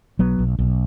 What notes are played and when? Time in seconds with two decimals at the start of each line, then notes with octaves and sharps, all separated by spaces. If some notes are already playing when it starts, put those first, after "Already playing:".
0.19 B1 F#3 B3
0.39 B1
0.59 B1